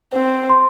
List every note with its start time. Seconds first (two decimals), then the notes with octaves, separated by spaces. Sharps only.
0.12 C4 C5
0.49 C6